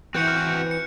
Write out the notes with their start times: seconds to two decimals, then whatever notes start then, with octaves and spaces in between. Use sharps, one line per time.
0.14 E3 C4 F#4 F#6 G6 C#7
0.28 F6
0.71 C#7